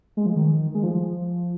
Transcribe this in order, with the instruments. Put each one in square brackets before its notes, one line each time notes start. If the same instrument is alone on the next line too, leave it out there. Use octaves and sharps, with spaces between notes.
[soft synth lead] G#3
F3
D#3
G#3
F3